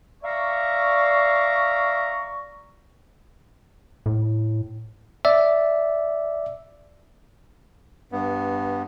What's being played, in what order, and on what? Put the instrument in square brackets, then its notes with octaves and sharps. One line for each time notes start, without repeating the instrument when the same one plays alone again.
[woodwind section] D5 E5 F5 A#5 C#6
[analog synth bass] A2
[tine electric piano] D5 E5
[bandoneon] G2 B3